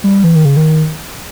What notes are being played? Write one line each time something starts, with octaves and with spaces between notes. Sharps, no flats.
G3
E3
D#3
C#3
D#3